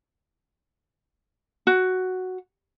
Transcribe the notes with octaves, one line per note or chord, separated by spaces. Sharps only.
F#4